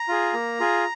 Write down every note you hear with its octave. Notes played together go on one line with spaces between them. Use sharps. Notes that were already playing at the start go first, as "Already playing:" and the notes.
Already playing: A#5
F4 G#4
A#3
F4 G#4